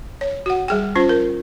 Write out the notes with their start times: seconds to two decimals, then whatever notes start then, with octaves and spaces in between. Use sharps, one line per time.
0.21 C#5
0.46 F#4 F#5
0.68 G3 G#4 G5
0.95 C#4 F4 C5
1.09 A#4